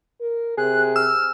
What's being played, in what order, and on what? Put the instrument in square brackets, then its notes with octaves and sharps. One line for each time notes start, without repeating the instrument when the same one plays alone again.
[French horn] A#4
[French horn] C3 [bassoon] G#4 [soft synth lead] F#6
[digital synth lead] E6 [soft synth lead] F6